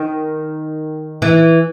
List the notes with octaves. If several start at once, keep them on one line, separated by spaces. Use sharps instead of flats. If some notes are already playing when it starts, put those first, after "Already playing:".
Already playing: D#3
E3